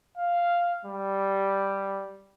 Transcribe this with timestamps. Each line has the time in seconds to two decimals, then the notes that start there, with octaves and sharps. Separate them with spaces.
0.18 F5
0.85 G3